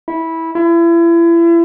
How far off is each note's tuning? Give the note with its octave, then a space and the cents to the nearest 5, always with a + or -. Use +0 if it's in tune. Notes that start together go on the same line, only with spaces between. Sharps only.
E4 -15
E4 +35